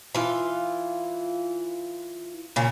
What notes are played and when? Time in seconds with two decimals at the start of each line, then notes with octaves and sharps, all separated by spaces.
0.15 E3 F4
2.56 A#2 C#3